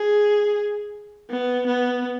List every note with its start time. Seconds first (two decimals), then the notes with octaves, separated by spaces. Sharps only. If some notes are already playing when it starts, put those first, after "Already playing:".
Already playing: G#4
1.30 B3
1.67 B3